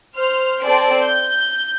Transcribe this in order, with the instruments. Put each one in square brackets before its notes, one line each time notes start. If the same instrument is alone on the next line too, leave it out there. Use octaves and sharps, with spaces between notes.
[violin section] C5 F6
C4 A4 C5 D5 D7
G6